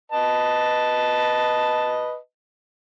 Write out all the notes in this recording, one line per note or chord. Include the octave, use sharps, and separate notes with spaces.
B4 D#5 A5